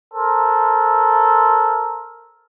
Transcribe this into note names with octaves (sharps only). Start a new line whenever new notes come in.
A4 A#4 C5